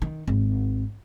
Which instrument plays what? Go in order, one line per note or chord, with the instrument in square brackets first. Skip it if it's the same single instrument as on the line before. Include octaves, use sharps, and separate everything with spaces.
[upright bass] D#3
G#1